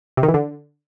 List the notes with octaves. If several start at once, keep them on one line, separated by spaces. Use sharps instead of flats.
C3
D#3
E3
D3